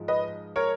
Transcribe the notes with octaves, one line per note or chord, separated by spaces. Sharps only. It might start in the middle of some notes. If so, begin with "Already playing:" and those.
Already playing: G#2 F3 G#3
B4 D#5
A#4 C#5